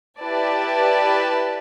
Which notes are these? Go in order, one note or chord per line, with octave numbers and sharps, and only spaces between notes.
E4 G4 B4 D5 A5